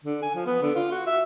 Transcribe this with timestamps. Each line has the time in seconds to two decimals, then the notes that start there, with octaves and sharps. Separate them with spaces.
0.04 D3
0.22 G#5
0.35 F3
0.46 B3
0.62 D3
0.75 F4
0.91 F#4
1.07 E5